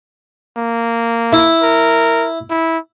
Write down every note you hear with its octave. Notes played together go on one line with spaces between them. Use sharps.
A#3
E4
A#4
E4